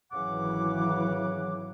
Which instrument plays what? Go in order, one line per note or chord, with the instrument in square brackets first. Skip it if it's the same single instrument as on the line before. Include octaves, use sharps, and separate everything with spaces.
[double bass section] G#1 E3 F#3 [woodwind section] C#3 F#5 D6